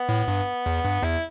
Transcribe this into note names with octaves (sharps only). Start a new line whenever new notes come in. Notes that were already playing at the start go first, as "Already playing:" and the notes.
Already playing: B3
A2
G2
E2
G2
E2 E4